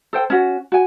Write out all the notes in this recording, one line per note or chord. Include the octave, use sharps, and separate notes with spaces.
A4 C5 G5
C#4 F#4
F#4 G#5